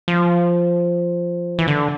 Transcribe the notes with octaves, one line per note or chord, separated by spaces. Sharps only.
F3
E3
D3